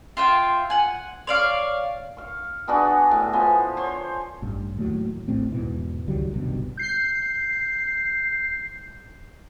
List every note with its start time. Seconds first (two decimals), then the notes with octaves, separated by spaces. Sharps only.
0.17 F4 E5 G5
0.70 F#5 G#5
1.27 C#5 D5 F5
2.17 F5 C#6
2.68 B3 D4 F#4 G#4
3.11 A2
3.33 F3 B3 G#5
3.77 C5 C#5
4.42 A1 G2
4.77 D#2 A2 F#3
5.28 D1 A1 A2 C4
5.52 E2 G#2 B2 E3
6.07 C#2 D#3 F#3 G3
6.32 G1 C2 G2 B2
6.77 G6 C7